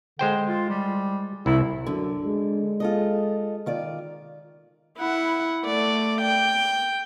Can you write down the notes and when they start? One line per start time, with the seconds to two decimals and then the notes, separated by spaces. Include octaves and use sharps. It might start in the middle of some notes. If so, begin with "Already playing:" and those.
0.19 D3 G#3 C5 G5
0.49 F4
0.69 G3
1.46 C2 E4
1.86 F#2 D3
2.26 G#3
2.80 F4 A4 D#5
3.66 D#3 F4 D5
4.98 E4 F#5
5.65 A3 D5
6.21 G5